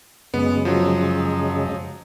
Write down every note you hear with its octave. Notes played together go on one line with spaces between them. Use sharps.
F#2 C#3 G#3 B3
F3 F#3